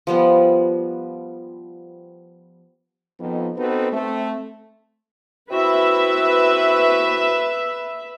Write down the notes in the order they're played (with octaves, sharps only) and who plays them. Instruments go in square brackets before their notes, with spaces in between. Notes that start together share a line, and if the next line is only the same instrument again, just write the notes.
[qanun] F3 G3 B3
[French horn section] F2 B3 D#4
B3 C4 D#4 F#4 A4 B4
A3 C4
[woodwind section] C4 E4 F#4 [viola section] B4 E5